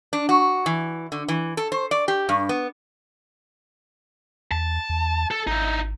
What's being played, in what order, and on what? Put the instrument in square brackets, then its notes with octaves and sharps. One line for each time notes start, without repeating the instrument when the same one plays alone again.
[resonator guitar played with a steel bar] D4
F#4
E3
D3
E3
A4
C5
D5
G4
G2
B3
[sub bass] E2 [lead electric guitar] A5
[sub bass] E2
[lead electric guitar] A4
[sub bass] G#1 [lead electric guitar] D#4 E4